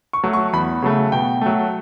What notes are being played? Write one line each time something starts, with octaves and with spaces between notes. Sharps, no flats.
C#6
F#3 A3
C#6
E2 B5
C#3 F#3 A3
B2 G5
F#3 A3